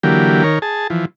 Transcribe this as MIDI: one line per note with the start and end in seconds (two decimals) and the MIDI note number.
0.03 0.43 50
0.03 0.43 52
0.03 0.43 54
0.03 0.43 58
0.03 0.43 67
0.44 0.59 51
0.44 0.59 70
0.44 0.59 73
0.62 0.87 68
0.62 0.87 81
0.90 1.05 52
0.90 1.05 53